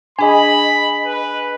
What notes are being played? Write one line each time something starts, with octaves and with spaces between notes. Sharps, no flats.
D4 G#4 D#5 G#5 B5
B4